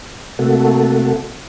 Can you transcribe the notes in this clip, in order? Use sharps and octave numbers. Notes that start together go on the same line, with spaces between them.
C3 A3 A#3 F#4 A4